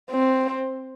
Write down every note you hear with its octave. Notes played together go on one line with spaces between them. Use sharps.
C4